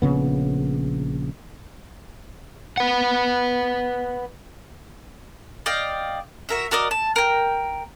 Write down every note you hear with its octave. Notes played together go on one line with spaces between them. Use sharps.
A#1 C#3 B3
B4 F#5
D5 D#5 F5 G5
F#4 A#4 E5
F#4 A#4 D5 D#5
A5
A#4 G5